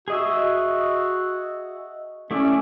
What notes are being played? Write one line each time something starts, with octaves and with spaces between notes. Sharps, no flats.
F#4 G#4 D#5 E5
A3 C#4 E4 D5